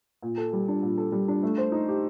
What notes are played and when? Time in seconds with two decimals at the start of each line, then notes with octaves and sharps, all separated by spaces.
0.22 A#2
0.37 A4
0.53 G3
0.68 D4
0.83 A#2
0.98 A4
1.12 G3
1.28 D4
1.43 A3
1.58 C5
1.72 D#4
1.88 G4